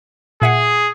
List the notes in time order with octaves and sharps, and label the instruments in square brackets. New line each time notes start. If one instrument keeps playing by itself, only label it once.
[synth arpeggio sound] A#2 E5 F#5 [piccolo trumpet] G#4